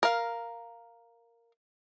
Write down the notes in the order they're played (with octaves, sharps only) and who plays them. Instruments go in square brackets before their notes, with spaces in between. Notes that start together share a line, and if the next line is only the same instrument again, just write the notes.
[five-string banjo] A#4 F5